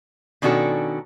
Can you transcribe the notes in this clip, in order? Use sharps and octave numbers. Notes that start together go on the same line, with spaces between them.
B2 D#3 C#4 D4 F#4 A4